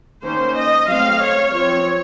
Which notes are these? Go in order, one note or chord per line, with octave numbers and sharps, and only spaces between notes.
D#3 A#3 C#4 C5
D#5
F#3 A3 C4 F5
C#5
F3 C4 C#5